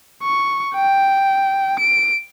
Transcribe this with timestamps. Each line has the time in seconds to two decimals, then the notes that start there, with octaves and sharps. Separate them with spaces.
0.23 C#6
0.75 G5
1.79 D7